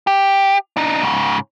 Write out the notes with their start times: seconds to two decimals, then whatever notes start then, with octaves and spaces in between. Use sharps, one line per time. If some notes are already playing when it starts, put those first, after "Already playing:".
0.07 G4
0.77 D4 D#4
1.03 G#2 C#3